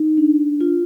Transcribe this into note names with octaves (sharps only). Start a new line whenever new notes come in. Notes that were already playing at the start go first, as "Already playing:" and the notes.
Already playing: D#4
D4
F4